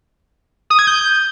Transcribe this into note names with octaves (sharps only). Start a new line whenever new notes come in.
D#6
G#6
G6